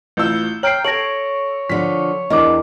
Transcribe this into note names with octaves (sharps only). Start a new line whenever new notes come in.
A1 F4 E6 G6
C#5 G5 A#5 F6 C7 D7 F#7
A4 C#5 A#6 D7 F#7
D3 F3 B6
E2 D4 A#4 D#5 D6